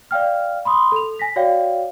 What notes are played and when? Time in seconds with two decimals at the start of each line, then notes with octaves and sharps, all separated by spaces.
0.11 D5 F5 G5 F6
0.65 B5 C6 D#6
0.92 A4 F7
1.19 G#5 A#6 B6
1.36 F#4 C#5 D5 F5 G5